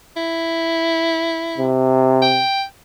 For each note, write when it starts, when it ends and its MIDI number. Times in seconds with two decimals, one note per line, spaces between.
0.17 1.70 64
1.58 2.44 48
2.22 2.64 79